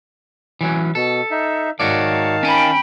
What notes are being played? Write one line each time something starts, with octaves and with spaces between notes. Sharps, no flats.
E3 F#3 C#4
B2 A4
D#4 E5
G#2 D#3 F#4 C#5 D5 F5 A5
C#4 G5 G#5 B5